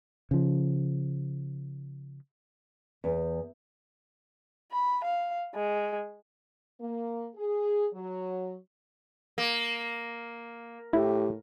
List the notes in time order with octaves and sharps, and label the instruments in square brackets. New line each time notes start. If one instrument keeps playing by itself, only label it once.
[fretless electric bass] C#3 F3
[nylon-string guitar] E2
[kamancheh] B5
F5
G#3
[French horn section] A#3
G#4
F#3
[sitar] A#3
[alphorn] A2 [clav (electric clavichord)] E4 [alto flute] G4